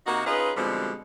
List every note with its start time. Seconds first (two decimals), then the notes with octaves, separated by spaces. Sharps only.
0.07 C3 A#3 D#4 F#4
0.26 C#4 D#4 F4 G#4 B4
0.57 B2 D3 F3 G3 G#3 C4